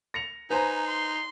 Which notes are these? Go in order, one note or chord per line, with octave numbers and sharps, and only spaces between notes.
A#6 C#7 F7
D#4 B4 C5 G#5 A#5
C6